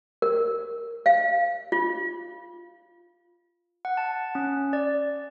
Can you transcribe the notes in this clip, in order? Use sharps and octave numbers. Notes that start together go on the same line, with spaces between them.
A#4
F5
F4
F#5
A5
C#4
D5